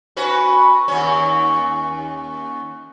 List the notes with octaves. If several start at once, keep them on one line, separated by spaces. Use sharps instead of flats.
C#4 F#4 B4
D#2 C#4